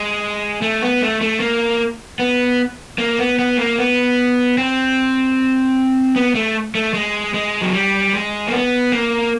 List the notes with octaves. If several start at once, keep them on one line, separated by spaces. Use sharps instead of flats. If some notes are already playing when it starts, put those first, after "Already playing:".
Already playing: G#3
A3
B3
A3
A3
A#3
B3
A#3
B3
B3
A#3
B3
C4
B3
A3
A3
G#3
G#3
F#3
G3
G#3
A#3
B3
A#3